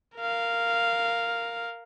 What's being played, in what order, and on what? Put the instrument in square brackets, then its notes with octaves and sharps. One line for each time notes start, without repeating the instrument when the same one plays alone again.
[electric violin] A#4 F5